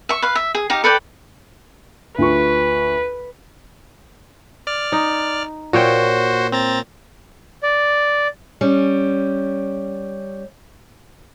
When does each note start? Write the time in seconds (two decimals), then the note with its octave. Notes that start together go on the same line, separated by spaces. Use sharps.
0.09 E5 C#6
0.22 B4 F5
0.36 E5
0.55 G#4
0.70 D#4 G4 F5
0.84 A4 B4 D5 G5
2.18 D2 F4 B4 C#6
4.67 D5 F6
4.92 D#4
5.73 A#2 F#4 C5 C#5 G5
6.52 C4 A#5 A6
7.63 D5
8.61 G3 C#4